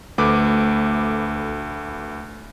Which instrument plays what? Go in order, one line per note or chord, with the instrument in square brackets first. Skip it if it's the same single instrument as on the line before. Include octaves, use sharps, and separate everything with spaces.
[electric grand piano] D2 A3 B4 D6